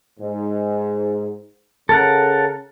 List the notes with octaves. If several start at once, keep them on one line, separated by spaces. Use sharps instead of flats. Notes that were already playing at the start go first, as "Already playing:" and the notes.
G#2
C#3 A4 A#4 F#5